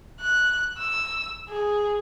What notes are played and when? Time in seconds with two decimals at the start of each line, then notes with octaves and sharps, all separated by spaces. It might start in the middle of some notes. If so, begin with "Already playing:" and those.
0.20 F#6
0.78 E6
1.49 G#4